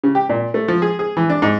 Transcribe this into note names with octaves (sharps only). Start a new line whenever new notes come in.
C#3
G4
A#2
A3
F3
G#4
G#4
E3
D4
G#2